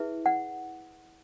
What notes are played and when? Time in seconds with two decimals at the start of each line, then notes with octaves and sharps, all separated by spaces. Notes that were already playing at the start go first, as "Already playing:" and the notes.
Already playing: E4 G#4 B4 E5
0.26 F#5